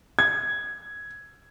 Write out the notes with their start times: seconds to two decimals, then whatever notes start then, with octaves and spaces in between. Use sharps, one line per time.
0.19 G#6